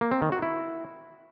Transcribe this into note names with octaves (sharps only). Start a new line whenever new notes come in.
A#3
C4
D#3
F#4
E4